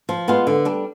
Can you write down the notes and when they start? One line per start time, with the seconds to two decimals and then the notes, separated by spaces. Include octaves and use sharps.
0.09 F3
0.28 G#3 B3 F4
0.47 D3
0.65 G3 D4